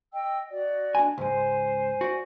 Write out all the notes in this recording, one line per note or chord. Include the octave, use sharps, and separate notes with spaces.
D#5 G5 E6
F#4 D5 D#5
D4 G#5
C#2 G#2 G#3 C5 G#5
F#4 D5